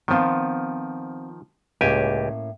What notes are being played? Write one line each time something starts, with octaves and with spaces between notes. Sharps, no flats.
D#3 F3 B3 C4 F4
C#2 A2 A#3 C#4 G4 G#5